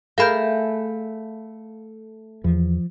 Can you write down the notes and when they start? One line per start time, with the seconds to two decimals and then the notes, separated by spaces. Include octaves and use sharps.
0.18 A3 G#4 A#4 F5 B5 G6
2.44 E2 F3